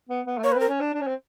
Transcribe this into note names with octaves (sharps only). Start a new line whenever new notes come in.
B3
B3
A3
A#3 C#5
B4
C4
A#4
C#4
D4
D4
C#4
C4